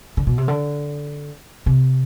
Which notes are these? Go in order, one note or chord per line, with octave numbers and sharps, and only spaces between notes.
D3
B2
C3
D3
C3